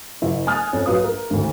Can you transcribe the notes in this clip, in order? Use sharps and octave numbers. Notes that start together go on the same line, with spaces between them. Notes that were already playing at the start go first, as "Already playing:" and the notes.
F#1 E4
G#5 D#6 F6 F#6 A6
F2 C#4
A#1 F#3 B4 F5 D#6
A#4
G#1 D2